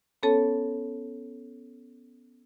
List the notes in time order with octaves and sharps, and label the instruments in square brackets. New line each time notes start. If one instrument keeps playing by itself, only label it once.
[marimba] B3 C#4 A4 C#5 A5